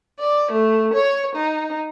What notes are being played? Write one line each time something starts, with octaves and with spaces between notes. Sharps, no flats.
D5
A3
C#5
D#4